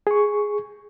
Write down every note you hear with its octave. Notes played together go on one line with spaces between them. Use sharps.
G#4 C#6